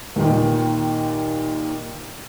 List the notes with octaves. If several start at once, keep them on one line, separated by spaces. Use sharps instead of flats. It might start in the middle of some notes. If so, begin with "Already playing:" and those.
D#2 A#2 D#3